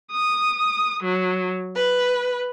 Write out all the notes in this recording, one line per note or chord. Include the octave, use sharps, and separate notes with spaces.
D#6
F#3
B4